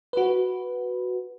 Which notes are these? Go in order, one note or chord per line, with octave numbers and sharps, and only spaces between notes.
F#4 B4